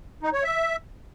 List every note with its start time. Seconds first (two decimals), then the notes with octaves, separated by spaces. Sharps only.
0.23 D#4
0.33 C#5
0.43 E5